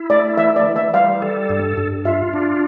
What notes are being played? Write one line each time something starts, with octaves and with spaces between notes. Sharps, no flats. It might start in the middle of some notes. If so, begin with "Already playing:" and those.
Already playing: E4
A3 D5
E3 E5
D5
E3
E5
G3 F5
A4
G2
G2
F4 E5
D4